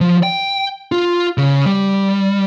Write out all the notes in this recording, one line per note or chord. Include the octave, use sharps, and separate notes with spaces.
F3
G5
F4
C#3
G3